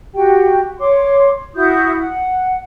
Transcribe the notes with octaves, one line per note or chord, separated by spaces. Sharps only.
F#4 G4 G5
C#5 C6 D6
E4 F#4 D#6 G6
F#5